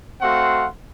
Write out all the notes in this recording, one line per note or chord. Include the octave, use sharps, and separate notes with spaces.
A3 C4 F#4 F5 F#5 C6